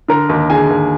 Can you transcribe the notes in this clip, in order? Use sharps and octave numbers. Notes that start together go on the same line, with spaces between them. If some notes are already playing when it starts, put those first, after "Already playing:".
D3 A#4 A#5
D#2
D3 G#4 G#5
D#2